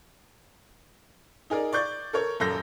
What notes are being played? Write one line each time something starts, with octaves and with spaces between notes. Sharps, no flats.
D#4 G#4 A#4 D5
D5 C#6 G6 A6
A4 A#4 C#5 C#6
D#1 F#2 A4 G6 A#6